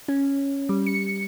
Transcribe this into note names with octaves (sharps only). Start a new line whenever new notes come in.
C#4
G3
C#7